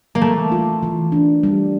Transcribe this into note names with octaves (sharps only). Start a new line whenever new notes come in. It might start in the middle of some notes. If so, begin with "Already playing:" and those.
A#3
E3 A3
F4
E3
D4
G3